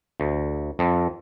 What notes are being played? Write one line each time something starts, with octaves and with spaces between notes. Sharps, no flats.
D2
F2